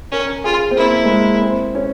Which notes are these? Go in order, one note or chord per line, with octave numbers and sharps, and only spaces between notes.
C#4 A#4
F4 G#4
C4
A#3 E4
G#3
A#3
C4
C#4